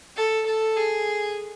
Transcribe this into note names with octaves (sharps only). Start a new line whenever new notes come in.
A4
A4
G#4